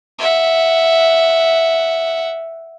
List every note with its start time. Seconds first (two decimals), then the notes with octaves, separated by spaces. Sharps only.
0.19 E5 F#5